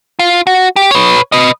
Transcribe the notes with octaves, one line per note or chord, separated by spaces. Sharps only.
F4
F#4
G4
B4 C#5
B4 D#5